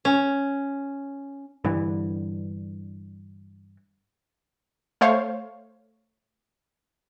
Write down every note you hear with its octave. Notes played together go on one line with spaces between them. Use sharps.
C#4
G2 D3 E3
A3 C5 C#5 F5